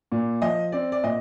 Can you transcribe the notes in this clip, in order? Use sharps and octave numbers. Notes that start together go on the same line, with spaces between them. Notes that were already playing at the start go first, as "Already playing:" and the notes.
A#2
F3 D#5
C4 D5
D5
A#2 D#5